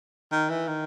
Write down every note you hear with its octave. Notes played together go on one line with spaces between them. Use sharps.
D#3
E3
D#3